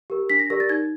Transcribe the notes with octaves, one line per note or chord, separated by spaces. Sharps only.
G4 A#4
D4 B6
A#6
G4 A#4 D5 A#6
A6
D#4 G#6